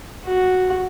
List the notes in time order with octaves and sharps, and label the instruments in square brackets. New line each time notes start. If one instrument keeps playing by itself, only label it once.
[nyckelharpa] F#4